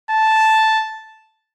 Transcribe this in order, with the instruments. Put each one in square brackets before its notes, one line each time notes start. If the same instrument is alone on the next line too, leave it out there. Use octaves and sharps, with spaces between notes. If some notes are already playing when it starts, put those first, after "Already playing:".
[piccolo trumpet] A5